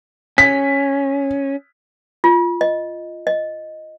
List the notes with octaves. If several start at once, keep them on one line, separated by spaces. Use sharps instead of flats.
C#4 B6
F4
D#5
D#5